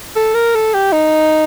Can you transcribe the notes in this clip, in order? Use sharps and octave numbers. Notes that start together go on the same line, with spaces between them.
A4
A#4
A4
G4
D#4